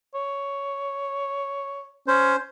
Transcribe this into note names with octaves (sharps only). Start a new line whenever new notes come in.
C#5
C#4 C5